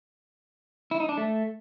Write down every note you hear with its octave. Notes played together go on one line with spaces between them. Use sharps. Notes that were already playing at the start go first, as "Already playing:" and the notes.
E4
D#4
D4
A3